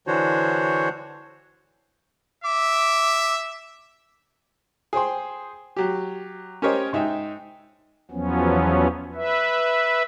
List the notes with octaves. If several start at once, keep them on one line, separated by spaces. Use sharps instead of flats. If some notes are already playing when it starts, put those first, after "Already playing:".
D3 E3 D4 F#4 C5 C#5
E5 D6
G#4 C5 G5 C6
F#3 G4
C#4 G4 A#4 C5 C#5 D#5
G#2 D#4 E5 G5
E2 F3 F#3 B3 C#4
B4 E5